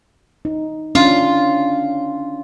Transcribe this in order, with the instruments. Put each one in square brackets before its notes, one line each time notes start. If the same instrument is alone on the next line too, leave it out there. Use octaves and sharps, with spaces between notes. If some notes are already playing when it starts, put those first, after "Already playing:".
[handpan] D#4
[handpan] C#4 D4 [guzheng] F4